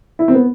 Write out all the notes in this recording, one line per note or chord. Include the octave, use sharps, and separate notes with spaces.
E4
C4
B3